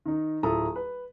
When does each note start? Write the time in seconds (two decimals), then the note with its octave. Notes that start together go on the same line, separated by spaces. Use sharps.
0.06 D#3 D#4
0.43 D1 E4 F4 A4 A#5 D#6
0.76 B4